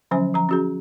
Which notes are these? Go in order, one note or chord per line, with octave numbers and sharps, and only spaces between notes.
D3 F3 F#3 C#4 C5 G#5
F3 A#5
C#4 F#4 G#4